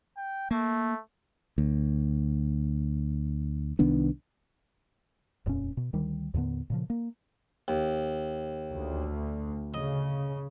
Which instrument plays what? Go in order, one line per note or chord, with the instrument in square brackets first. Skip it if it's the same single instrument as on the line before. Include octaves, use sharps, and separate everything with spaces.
[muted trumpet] G5
[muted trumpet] A3 [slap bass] A#3
[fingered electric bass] D2
C2 D#3 B3 D4
D#1 F2 A#2 C#4
B2
D2 D#3 G3
D#2 A2 D3 B3
A#2 C#3 F3
A#3
[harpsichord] D#2
[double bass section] D2
[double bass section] C#3 [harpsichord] D#5